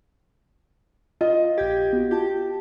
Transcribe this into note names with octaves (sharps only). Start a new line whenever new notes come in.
F4 D#5
A#1 G4 G6 G#6
B3 F#4
F4 G4 A5